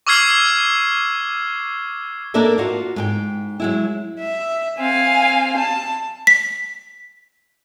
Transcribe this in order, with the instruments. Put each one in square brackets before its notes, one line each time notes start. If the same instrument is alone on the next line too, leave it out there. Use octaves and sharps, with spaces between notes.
[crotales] C#6 D6 E6 F6 G#6 C7
[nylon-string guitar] A#3 D4 A4 A#4 D5 E5
F4 F#4
G#2 G#4 G5
F#3 G#3 E4
[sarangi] E5
[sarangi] C4 [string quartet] F5 G#5
[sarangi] A5
[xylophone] B6